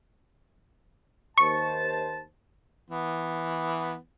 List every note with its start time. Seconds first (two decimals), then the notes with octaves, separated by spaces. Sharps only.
1.38 D#2 C5 A5 C#6
2.90 E3 B3